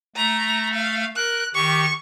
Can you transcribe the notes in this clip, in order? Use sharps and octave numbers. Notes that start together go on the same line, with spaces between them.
A3 A#5
F5
A#4 F#6
D#3 G4 C#6